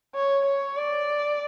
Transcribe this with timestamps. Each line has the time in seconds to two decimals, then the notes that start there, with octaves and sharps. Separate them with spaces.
0.15 C#5
0.45 C#5
0.77 D5